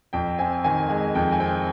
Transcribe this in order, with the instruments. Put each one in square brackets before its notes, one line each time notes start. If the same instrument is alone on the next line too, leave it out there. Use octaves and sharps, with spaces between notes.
[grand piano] F2 G5
C4 G#5
D#3 G#5
G#3 G#5
F2 G5
G#5
C4 G5